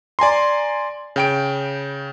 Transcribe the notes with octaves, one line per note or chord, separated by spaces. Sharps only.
D5 G#5 A#5 C6
C#3 G5 D7